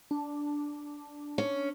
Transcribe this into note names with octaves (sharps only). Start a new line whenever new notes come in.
D4
C#4